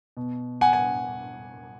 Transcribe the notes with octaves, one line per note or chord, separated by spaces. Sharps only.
B2
F#5 G#5
G#5